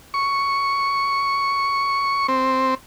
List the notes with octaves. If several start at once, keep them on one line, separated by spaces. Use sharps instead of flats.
C#6
C4